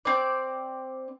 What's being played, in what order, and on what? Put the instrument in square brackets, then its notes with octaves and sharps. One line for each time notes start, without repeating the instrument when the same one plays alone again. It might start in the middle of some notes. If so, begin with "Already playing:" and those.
[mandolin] C4 D5